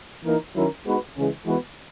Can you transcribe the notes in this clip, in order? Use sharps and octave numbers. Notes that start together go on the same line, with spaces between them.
E3 A#3 D#4 A#4
D#3 F#3 C#4 E4 A#4
G#3 B3 D#4 F#4 B4
C#3 E3 G#3 C#4 G#4
E3 G#3 B3 F#4 B4